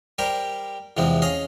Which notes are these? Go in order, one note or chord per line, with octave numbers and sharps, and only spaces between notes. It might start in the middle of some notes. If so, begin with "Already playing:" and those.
G3 G4 A#4 C5
E2 C3 E3 F3 G#3 C4
C#4 G#4 D#5 F5